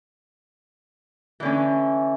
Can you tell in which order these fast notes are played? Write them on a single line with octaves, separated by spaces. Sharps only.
E3 D3 C#4